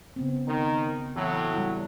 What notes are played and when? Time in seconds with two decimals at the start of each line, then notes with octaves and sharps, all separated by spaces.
0.16 C#3 B3 C4
0.48 D#3
1.16 A2 E3 F#3
1.54 G3 E4